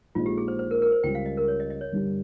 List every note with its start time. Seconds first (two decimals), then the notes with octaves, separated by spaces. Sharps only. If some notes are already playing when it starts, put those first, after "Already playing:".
0.15 A#1 A#2 G#3 D#4 F4
0.26 G4
0.38 G#4
0.48 C5
0.59 C5
0.71 A#4
0.82 A#4
0.92 C5
1.04 C#2 C#3 G3 C#4 G5
1.15 F5
1.26 D#5
1.37 A#4
1.48 C#5
1.60 D#5
1.70 D#5
1.81 C#5
1.92 G1 G2 G3